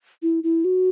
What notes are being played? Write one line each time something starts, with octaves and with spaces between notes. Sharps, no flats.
E4
E4
F#4